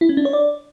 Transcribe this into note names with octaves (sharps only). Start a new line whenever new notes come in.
E4
C#4
D4
C#5
D5